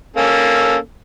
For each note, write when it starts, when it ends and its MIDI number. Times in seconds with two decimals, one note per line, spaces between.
0.17 0.76 58
0.17 0.76 61
0.17 0.76 69